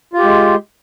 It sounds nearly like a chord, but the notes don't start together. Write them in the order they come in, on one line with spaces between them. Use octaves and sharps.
F4 G4 G#3